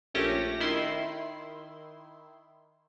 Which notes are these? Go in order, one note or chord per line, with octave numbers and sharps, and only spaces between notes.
A#1 A3 C#4 G4 A#6
D#3 E4 C6